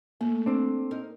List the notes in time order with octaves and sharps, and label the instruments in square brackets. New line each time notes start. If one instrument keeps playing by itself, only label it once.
[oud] A3 [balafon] A#3
[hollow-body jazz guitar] C4 D4
[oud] D#4 A#4